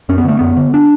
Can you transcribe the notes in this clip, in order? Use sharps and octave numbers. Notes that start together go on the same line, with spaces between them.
F#2 C#4
B3
D3 A3
F#2 B3
D3
D4